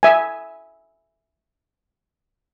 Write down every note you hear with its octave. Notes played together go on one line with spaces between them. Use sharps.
E5 G#5